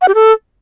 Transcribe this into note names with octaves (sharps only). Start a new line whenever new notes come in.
F#5
G4
A4